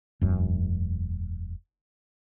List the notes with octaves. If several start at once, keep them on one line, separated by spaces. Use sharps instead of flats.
E1 F#2